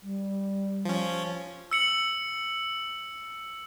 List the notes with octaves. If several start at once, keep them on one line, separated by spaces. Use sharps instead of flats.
G3
F3 C#4
E6 C#7 F#7